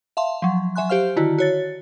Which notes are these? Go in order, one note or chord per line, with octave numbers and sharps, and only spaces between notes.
E5 F5 A5 C6
F3 F#3
F#3 E5 G#5 C6 F#6
G4 C5 F5 F6
D3 D#3 E4 F#4
F#4 C#5 A6